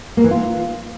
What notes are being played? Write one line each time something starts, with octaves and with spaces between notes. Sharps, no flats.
A#3
E3
F4